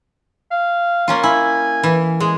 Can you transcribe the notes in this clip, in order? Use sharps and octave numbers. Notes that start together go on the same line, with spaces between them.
F5
A#3 C#4 F4
E4 G#5
E3
G#3 G#4